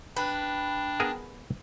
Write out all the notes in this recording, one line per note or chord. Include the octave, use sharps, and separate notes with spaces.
D4 B4 G5
B3 G#4 A#4